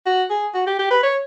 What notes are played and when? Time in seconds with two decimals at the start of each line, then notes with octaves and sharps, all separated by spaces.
0.06 F#4
0.30 G#4
0.54 F#4
0.67 G4
0.79 G4
0.91 B4
1.03 C#5